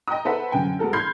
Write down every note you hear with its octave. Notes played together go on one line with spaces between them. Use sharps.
D#5 G5 A#5 D#6
B3 A4 B4 C5 E5 F#5
F#2 D3 G5 G#5
G#3 B3 F#4 A4 A#4
B5 C6 F6 G6 G#6 C7